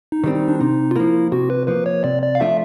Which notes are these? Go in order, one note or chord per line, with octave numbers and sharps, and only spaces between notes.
D#4
D#3 G3 C4
D#4
D4
C3 D#4
F4
F3 A#3 E4
C3 F#4
B4
F3 A#3 B4
C#5
C3 D5
D5
F5
F3 A3 D4 F4 E5